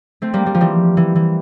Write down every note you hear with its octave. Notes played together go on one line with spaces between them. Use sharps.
A3 C4
G3 A#3
G3
F3
E3 G3
E3
E3